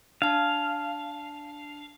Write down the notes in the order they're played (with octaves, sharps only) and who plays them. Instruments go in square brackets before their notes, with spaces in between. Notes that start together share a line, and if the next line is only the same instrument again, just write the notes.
[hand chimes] D4 A5 [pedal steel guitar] F5